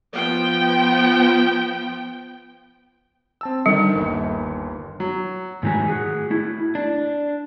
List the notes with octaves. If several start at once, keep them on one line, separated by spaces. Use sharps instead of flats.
F3 B3 G5
C4 A5 E6
D3 D#3 G3
G1 D#2
F#3
G#2 D#3 F#3 A3 G#5
F#4 G#4
A3 E4
D4